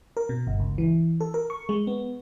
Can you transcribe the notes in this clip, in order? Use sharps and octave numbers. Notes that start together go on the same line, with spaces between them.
A#4
B2
G1
C#2
E3
A4
A#4
C#6
G#3
B3